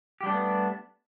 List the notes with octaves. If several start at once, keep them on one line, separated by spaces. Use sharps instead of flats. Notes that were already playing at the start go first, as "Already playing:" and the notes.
G3 A3 B3 D4 G4